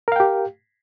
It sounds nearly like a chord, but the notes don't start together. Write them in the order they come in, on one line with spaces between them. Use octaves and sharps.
A#4 F5 G5 G4